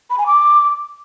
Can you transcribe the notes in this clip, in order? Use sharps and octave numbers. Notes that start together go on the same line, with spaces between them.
B5
G#5
D6